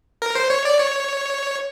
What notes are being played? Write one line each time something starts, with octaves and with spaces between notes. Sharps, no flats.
A#4
C5
C#5
D5
C#5